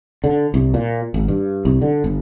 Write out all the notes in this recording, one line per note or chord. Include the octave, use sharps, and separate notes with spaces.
D3
C2
A#2
G#1
G2
C2
D3
G1